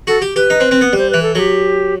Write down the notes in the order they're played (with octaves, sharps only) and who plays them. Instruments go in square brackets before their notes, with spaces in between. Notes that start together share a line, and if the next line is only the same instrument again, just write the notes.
[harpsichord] F#4 [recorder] A4
[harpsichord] G4
[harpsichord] G4 [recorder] B4
[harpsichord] D#4
C4
C4
B3
G3
[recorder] C5
[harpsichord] E3 [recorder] B4
[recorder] A4
[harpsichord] F#3 [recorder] A4
[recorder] G4